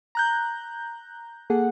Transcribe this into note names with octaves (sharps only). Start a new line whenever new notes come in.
A#5 F#6 G6
A#3 G#4 A4 F#5